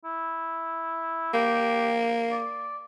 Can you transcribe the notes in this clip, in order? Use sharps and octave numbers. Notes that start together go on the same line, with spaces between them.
E4
A#3 G4
D5